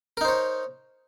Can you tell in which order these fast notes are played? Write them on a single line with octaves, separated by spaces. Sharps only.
A#4 D#4 C5 C#5